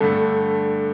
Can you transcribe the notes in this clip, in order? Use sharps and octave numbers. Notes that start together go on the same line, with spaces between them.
G2 D3 A3 A4